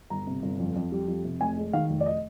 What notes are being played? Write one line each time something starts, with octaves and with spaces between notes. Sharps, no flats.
G1 A#5
C3
G1
F2
F2
G3
F2
C3
F1 G#5
G#3
D#3 F5
F1
D5
D#5